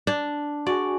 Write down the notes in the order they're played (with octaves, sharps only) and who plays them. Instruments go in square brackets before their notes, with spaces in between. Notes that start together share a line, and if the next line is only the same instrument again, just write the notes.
[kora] D4
[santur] F#4 G#4 [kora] D5